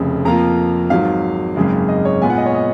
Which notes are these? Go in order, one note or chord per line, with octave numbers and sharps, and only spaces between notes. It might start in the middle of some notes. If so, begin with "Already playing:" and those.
Already playing: F1 F2 C#3
F2 F3 A#3 F4 A#5
G#1 G#2 F#3 F5
G#1 F#2 C#3 G#3
D#5
C#5
A#2 G#3 B3 F4 G#5
F#5
D#5
C#5
D#5